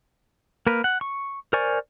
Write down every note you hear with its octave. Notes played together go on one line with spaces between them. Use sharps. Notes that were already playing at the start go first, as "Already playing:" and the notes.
A#3 A#4 B4
F#5
C#6
A#4 C5 D5 G#5 C#6